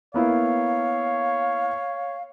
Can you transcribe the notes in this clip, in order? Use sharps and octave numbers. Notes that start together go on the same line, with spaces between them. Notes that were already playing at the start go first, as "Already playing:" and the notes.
A#3 B3 E4 C#5 F5